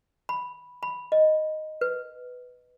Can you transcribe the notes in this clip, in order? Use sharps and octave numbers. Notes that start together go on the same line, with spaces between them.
B5
B5
D#5
B4